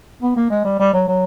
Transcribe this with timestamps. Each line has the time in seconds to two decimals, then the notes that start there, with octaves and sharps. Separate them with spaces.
0.22 B3
0.36 A#3
0.50 G#3
0.65 G3
0.80 G3
0.93 F#3
1.08 F#3